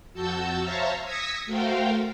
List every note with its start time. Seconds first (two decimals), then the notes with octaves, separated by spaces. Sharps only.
0.14 F2 F#4 A5 E6 G6
0.61 C5 C#5 E5 F5 A5 A#5
1.04 D#6 E6 G#6 A#6 B6 C#7
1.46 A3 F#4 A#4 C5 F5 G5